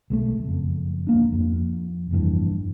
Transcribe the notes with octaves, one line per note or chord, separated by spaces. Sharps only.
B1 G#3 A3
F#1 F2
D1 A#3 D4
F2
F1 A#1 G2 E3